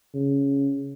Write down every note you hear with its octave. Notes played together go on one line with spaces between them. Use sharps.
C#3